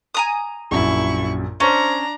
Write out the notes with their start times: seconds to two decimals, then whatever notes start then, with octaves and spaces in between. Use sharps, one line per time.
0.15 G#5 A#5 D#6
0.71 A#1 F#2 E4 C#6
1.60 C#4 D4 C5 A#5 C#6